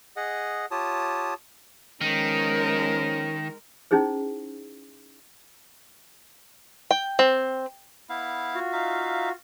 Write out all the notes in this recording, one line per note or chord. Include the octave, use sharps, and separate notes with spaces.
G#4 D#5 F#5
F4 G4 C#5 A5 D#6
D#3 F3 G#3 B3 C#4 A#4 A#6
C#4 D#4 E4 G#4 C5
G5
C4
B3 E4 F5
F4 F#4
D#4 E5 F5